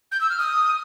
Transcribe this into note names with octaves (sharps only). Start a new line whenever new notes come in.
G6
E6
F6
D#6